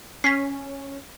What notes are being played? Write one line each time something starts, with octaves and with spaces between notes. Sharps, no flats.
C#4 B6 C7